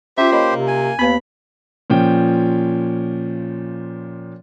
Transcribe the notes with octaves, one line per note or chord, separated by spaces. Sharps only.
C#4 F4 G4 C5 E5
A#3 C#5 D#5 B5
C3
G#5
D#2 B3 B4 B5
A#2 F3 C#4 G5